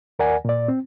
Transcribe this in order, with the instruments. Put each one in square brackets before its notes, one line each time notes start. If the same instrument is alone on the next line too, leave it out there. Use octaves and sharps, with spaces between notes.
[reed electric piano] D#2 A#4 D5 F#5 G#5
A#2 D5
C4